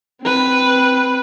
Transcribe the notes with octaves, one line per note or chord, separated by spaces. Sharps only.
C4 B4